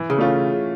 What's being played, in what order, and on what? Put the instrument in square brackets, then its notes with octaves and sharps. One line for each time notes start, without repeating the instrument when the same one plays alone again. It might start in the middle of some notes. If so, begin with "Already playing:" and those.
Already playing: [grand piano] E3
[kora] C#3
[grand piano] A3 C#4 F4